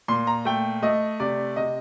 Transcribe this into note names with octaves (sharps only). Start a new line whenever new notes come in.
A#2 C6
A#5
A3 G5
A3 D#5
C3 D5
C3 D#5